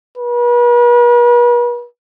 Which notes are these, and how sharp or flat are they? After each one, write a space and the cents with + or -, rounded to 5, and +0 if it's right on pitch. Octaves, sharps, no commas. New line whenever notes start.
B4 -40